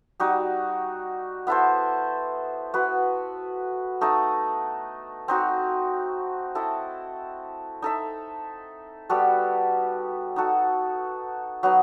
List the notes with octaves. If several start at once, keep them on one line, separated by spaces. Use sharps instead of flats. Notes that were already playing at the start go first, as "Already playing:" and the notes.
G3 D#4 F#4
B3 E4 A4 C5
B3 F#4 B4
A3 D#4 A4 D#5
C4 D#4 F#4
E4 A4 D#5
D#4 A4 E5
G3 B3 F#4 A4
D#4 F#4 A4
F#3 B3 D#4